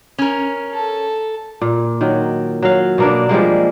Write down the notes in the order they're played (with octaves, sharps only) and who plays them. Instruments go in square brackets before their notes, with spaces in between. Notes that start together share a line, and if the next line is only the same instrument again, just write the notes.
[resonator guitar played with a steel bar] C#4 A#4
[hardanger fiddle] A4
[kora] A#2
D#3 F#3
F#3 F5
B2 A#3 D4
F3 G3 G#3 A#3